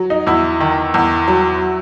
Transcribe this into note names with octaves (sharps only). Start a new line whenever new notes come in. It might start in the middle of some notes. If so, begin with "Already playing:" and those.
Already playing: F#3
D#4
E2 E4
D#3
E2
F#3